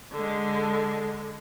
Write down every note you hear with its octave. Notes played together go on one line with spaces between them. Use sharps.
D3 G#3